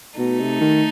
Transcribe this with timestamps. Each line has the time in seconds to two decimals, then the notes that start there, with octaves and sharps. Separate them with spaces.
0.18 B2 A3 D#4 A4
0.40 C3
0.60 D#3